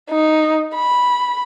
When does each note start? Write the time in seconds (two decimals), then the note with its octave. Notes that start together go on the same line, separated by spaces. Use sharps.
0.11 D#4
0.76 B5